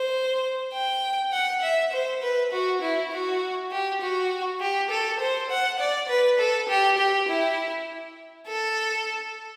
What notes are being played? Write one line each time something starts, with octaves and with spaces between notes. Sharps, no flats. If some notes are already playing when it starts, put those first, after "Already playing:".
Already playing: C5
G5
F#5
E5
C5
B4
F#4
E4
F#4
G4
F#4
G4
A4
C5
F#5
D5
B4
A4
G4
G4
E4
A4